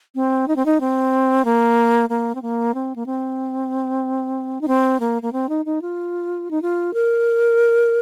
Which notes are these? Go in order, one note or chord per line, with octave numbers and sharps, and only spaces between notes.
C4
D#4
C4
D#4
C4
A#3
A#3
C4
A#3
C4
A#3
C4
D#4
C4
A#3
A#3
C4
D#4
D#4
F4
D#4
F4
A#4